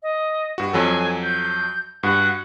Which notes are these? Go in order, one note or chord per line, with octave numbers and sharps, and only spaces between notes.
D#5
G2 F#4
F2 F#3 A4 G#5
G6
G2 F#4 F#5